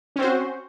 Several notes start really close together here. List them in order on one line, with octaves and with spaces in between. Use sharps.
C#4 C4 C5 F#4